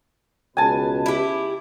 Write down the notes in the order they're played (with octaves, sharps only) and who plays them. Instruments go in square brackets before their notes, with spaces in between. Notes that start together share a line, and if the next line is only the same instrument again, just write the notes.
[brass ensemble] C#2 B2 B4 [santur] G#5 A5
[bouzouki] E4 G4